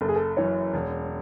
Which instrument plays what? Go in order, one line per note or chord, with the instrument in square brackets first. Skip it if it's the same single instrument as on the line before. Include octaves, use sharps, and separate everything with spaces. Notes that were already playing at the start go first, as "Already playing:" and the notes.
[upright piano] F#1 [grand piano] A4
[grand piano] G#4
A4
[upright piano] F#2 E3 [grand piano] C#5
[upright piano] E1